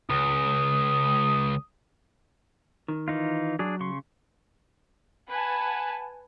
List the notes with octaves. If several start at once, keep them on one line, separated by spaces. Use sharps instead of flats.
C#2 D#6
D#3
E3 D#4 F4
F#3 D4 G#4
C#3 C6 C#6
B4 F#5 G#5 A5